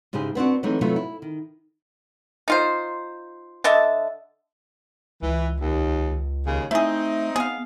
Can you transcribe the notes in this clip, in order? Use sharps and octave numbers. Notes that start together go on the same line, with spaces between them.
G#2 C#3 E4 G4 G#4
B3 C4 D4 F#4
E3 F#3 G#3 A3 C4 D#4
C3 F#3 A3 B3 E4 F4
E4
D#3
D#4 F4 C5
D3 D#5 E5 A5
C#2 E3
D#2
D#2 C#3
A3 C4 D#4 E4 G#4
B3 G#4 F5